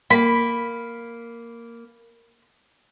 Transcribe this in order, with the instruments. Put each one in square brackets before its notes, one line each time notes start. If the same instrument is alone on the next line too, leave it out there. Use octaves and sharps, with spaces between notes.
[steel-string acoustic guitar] A#3 [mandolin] B5